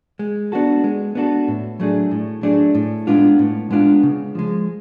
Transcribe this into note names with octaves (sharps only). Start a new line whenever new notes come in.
G#3
B3 D4 F#4 A4
G#3
B3 D4 F#4 A4
A2
F#3 A3 D4 G#4
A2
F#3 A3 D4 G#4
A2
G#3 B3 D4 F4
A2
G#3 B3 D4 F4
C#3
F3 G#3